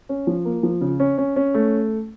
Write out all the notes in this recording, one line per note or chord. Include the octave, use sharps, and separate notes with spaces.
C#4
F3
A#3
F3
C#3
C#4
C#4
C#4
A3